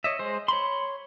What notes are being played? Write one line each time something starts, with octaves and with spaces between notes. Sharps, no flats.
C#5 D#5 E5
G#3 C5
C#5 B5 C6